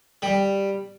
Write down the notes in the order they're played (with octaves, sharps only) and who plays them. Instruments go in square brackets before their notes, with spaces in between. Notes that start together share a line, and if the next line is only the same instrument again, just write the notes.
[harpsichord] G3